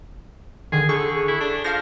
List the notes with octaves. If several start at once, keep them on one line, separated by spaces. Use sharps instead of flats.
D3 D#3 G#4
D3 G#4 A4 C#6
E4
D4
F3 F5 F6 A#6